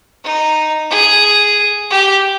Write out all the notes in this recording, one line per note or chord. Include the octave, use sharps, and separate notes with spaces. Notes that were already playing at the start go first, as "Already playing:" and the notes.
D#4
G#4
G4